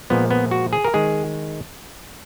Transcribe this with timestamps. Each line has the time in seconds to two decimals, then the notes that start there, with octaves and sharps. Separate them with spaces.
0.10 A#2 F3 G#3 B3
0.31 B3
0.51 F#4
0.73 G#4
0.84 A#4
0.94 D#3 G#3 G#4